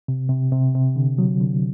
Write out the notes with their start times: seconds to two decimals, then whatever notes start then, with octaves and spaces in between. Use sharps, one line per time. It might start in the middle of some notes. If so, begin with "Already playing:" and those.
0.08 C3
0.29 C3
0.52 C3
0.75 C3
0.96 D3
1.18 F#3
1.40 D3